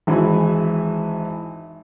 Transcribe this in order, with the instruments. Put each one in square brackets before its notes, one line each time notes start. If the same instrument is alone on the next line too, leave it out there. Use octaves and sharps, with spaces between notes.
[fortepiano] G#1 E3 F#4 G#5 B5